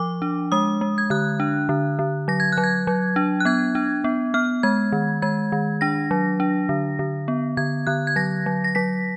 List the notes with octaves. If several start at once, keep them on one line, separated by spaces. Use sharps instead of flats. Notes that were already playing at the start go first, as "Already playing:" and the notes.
Already playing: F3 D6
D4
G#3 D#6
G#3
G#6
D3 F#6
D4
D3
D3
F#3 A#6
G#6
F#6
F#3
G#6
F#3
D4
F#6
B3 G#6
D4
B3
B3 F6
G#3 G#6
D#3
G#3 G#6
D#3
D4 A#6
F#3
D4
D3
D3
B3
D3 G#6
D3 F#6
G#6
F#3 A#6
F#3
A#6
F#3 B6